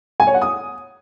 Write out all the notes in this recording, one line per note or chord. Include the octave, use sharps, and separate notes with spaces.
G#5
C#5
F#5
D#6